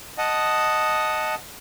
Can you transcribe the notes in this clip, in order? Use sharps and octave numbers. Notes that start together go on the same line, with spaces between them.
D#5 F#5 A5 D#6